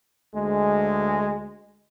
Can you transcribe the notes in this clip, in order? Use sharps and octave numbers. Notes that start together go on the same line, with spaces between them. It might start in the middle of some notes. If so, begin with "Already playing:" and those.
D2 G#3